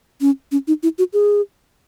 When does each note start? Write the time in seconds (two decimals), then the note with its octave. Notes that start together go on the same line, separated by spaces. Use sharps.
0.21 C#4
0.52 C#4
0.67 D#4
0.83 E4
0.98 F#4
1.13 G#4